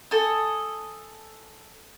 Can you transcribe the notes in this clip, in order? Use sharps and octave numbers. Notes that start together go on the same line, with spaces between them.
A4 G#5 D#6